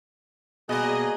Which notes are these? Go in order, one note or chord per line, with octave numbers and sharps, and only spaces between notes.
B2 G3 A#3 G#4 D#5